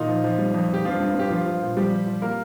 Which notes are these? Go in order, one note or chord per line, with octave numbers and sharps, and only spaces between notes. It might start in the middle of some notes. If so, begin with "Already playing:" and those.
Already playing: A#2 D#3 D#4
F3
F3
G3
F2
F2 G4
G2 F3 F4
G2
G2 G4
F3 F4
F3
A#2
F3 G3 G4
F3
F3
A#3 A#4